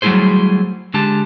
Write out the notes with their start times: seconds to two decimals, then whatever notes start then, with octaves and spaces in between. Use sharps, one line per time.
0.02 F#3 G3 A3 E4 G#4 C5
0.94 D3 G#3 G4 A5